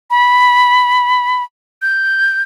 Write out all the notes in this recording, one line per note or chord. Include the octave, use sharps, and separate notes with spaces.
B5
G6